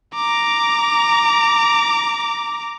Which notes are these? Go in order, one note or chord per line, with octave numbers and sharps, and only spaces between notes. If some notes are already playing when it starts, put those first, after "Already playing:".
A#5 D6